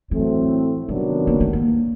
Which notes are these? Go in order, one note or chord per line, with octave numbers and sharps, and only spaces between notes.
A2 E3 F#3 A3 C4
C3 D#3 F#3 G3 B3 D4
A#3
A3
A#3